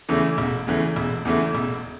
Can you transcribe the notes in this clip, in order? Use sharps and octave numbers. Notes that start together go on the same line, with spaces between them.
E2 C#3 E3 A3
E1
E2 C#3 E3 A3
E1
E2 C#3 E3 A3
E1